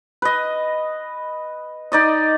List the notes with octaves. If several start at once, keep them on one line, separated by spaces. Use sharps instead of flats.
B4 D#5
D#4 D5 D#5